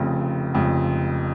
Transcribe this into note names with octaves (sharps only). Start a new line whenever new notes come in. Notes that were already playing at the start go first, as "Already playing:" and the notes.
Already playing: F1 F2 C#3
F1 F2 C#3